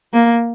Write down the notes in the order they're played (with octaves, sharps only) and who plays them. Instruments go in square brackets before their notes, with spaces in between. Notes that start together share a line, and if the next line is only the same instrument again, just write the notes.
[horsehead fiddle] A#3